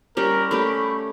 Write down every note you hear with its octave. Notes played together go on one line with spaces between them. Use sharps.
G3 C#4 A#4
A3 C#4 G4 B5